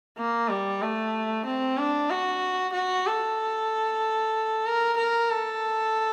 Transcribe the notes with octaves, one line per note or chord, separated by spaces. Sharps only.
A#3
G3
A3
C4
D4
F#4
F#4
A4
A#4
A#4
A4